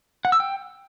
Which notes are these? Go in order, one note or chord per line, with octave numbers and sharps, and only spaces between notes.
F#5
E6
G5